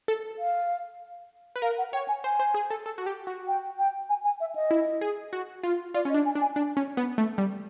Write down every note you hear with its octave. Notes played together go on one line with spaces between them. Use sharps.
A4
F5
B4
A#4 F5
F#5
C#5 G5
G#5
C5 G#5
C5
G#4
A4
A4
F#4
G4
F#4
G5
G5
G#5
G#5
E5
D#5
E4
G#4
F#4
F4
F4 D5
C#4
D#5
D4
G#5
D4
G#5
D4
C#4
B3
A3
G3